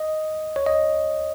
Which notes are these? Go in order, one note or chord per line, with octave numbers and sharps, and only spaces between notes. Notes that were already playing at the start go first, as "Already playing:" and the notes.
Already playing: D#5
C#5
D#5